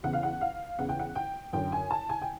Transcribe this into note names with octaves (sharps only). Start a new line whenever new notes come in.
E2 C#3 E3 F#5
F5
F#5
F5
E2 C#3 E3 F#5
G5
F#5
G5
F#2 D3 G5
G#5
A5
G#5
G5